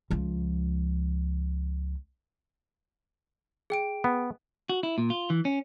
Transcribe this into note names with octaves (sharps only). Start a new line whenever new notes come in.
C#2 F3
G#4 G5 D7
B3
F#4
E4
A#2
F4
E3
C#4